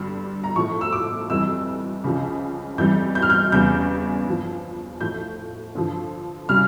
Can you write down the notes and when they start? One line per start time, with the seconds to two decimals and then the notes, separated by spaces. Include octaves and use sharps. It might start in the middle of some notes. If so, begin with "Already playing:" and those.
Already playing: G2 D3 G3
0.44 A#5
0.56 A2 F3 C#6
0.81 E6
0.93 D6
1.30 F2 E3 G3 E6
2.04 C#2 C#3 F3
2.78 F2 E3 G3 G6
3.15 G6
3.22 F6
3.30 G6
3.52 E2 C#3 G3 G6
4.26 G2 F3
5.01 A2 F3 G6
5.75 G2 D3 F3
6.49 C#3 G3 F6